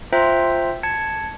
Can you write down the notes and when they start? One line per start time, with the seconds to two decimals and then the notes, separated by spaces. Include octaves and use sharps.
0.13 F4 C5 E5 G5 A#5 C6
0.83 A5 G#6 C#7